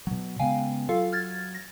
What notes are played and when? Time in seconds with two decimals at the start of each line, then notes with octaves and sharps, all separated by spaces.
0.07 B2 F#3
0.39 C#3 G#3 B3 F5 G5 G#5
0.89 F#3 F4 A4 F5
1.12 F6 G#6 A6
1.55 A#6